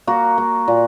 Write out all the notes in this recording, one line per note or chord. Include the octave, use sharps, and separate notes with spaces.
A#3 F#4
A#3
A#2